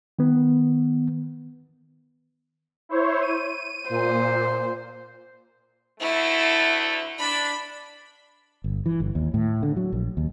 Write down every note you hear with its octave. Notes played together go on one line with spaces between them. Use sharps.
D#3 B3
E4 C5 C#5
D#7
A#2 C5
D2 D3 A3 E4
D4 B5
G1
E3
G1
D#2
A2
D3
F#3
A#1
D#2